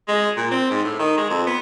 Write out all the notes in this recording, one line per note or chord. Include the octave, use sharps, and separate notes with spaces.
G#3
A#2
C4
G#2
A2
D#3
G#3
F2
B3